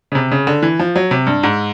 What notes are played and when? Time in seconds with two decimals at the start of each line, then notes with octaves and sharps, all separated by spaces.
0.12 C#3
0.15 C3
0.32 C#3
0.47 D3
0.62 E3
0.79 F3
0.96 F#3
1.11 C3
1.27 G2
1.43 G#2